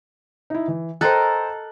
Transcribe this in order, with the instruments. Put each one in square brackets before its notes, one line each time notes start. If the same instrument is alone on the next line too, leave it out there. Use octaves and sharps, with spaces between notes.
[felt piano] D#4 E4
E3
[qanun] A4 A#4 D#5 [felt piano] C5 G5 F#6